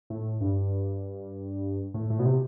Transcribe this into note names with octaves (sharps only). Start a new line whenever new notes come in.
A2
G2
A2
A2
B2
C3